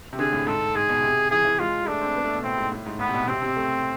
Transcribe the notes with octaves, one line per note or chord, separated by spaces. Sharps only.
C3
D3 G#4
A2
G#2 A4
G#2 G#4
B2
C3
E3 G#4
E3
G#3 F4
G#3
A3 D4
C4
B3
A3
B2
A2 C4
G#2
A2
G#2
A2 B3
C3
B2
C3 C4
C3
A3